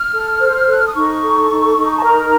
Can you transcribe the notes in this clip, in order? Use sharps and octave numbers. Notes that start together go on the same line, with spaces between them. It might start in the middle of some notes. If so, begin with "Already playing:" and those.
Already playing: F6
A4
C5
A4 F#6
F6
D#6
D#4 C#6
A4
D#4
D#4
A5
A#4 A#5